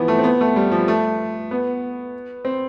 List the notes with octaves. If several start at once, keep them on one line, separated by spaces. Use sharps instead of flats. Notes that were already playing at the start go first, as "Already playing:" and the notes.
Already playing: E3 F3 B3
A3
C4
B3
A3
G3
F3
A3
B3
C4